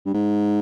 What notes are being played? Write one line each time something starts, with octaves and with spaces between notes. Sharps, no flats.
G2
G#2